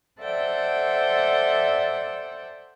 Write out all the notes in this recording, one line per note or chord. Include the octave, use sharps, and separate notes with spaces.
A4 C5 D5 E5 F#5 G5